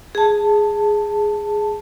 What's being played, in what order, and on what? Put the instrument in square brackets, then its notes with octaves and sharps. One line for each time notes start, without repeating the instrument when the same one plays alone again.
[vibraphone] G#4 A5